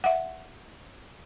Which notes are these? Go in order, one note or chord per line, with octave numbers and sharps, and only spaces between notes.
E5 F#5